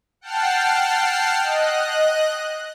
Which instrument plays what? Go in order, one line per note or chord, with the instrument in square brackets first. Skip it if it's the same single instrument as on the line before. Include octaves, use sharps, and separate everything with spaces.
[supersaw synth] F#5 G5 A5 F6 C7
D#5 F#6